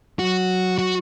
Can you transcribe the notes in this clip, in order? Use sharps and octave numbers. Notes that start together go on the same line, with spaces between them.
F#3 F#4
F#4